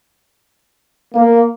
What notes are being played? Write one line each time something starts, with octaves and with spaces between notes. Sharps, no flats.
A#3